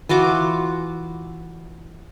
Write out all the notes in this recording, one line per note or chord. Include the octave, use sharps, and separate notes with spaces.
E3 F4 F#4 D6